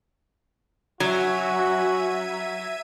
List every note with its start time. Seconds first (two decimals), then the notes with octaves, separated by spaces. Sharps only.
1.00 F#3 C#4 F#4 E5 G#6 D#7